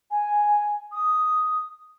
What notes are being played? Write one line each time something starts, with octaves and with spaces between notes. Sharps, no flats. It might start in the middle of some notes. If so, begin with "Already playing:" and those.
G#5
D#6